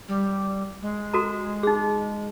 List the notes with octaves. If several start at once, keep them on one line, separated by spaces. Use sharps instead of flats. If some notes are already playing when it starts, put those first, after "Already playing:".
G3
G#3
F#4 A4 A#5
D#4 G#4